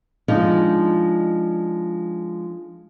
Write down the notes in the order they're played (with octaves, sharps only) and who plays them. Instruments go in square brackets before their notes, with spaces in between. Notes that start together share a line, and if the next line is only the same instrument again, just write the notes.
[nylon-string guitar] F3 G#3 D4 D#4